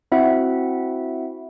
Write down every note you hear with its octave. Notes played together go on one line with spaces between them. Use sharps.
C4 E4 F#4 E5 F#5